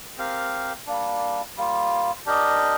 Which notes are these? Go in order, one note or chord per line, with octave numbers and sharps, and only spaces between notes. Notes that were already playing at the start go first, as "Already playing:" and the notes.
C4 G4 A#4 F5
G3 A#3 D4
G3 A#3 F4
D4 G4 A#4 D#5